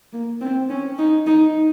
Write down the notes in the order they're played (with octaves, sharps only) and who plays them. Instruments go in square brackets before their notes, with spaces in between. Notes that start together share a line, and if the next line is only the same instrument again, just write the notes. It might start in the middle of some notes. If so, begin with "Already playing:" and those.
[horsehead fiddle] A#3
C4
C#4
D#4
D#4